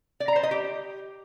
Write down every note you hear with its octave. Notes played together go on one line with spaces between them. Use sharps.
D5
A#5
C5
D#5
G4